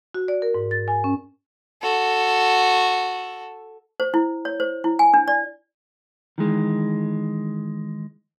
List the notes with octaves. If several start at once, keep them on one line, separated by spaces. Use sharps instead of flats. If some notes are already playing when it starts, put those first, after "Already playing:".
F#4
D5
A#4
G#2
A6
G#5
C#4
F#4 A4
C5
E4
C#5
C5
E4
G#5
D4
D5
D#3 E3 G#3